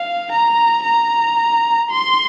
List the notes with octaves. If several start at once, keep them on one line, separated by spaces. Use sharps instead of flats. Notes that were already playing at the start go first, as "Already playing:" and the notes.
Already playing: F5
A#5
A#5
C6